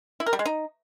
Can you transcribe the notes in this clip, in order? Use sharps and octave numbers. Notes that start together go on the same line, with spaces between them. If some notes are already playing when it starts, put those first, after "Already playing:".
E4
A#4
G3
G#3
D#4